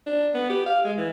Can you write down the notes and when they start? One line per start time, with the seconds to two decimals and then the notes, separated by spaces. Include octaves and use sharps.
0.06 D4
0.34 B3
0.50 G4
0.66 F5
0.85 G#3
0.98 E3